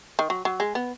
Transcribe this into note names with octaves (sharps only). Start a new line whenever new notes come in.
D#3
F#3
F#3
G#3
B3